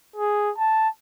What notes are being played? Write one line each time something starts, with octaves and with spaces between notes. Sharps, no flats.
G#4
A5